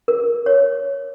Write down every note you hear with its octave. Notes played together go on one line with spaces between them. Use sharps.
A#4
C#5